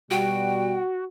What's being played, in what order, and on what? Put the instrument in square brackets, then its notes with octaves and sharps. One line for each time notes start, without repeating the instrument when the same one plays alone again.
[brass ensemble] B2 G3 [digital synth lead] F#4 [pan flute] G5